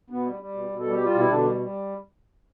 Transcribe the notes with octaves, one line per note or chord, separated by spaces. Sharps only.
B2 B3
G3
G3
B2
B2
G3 A4
G4
G3
F4
B2 E4
B2 D3 D4
G3
G3